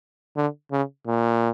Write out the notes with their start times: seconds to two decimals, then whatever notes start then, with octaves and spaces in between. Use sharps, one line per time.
0.36 D3
0.72 C#3
1.07 A#2